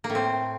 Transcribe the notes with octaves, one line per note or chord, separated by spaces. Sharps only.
A#3
A2
C4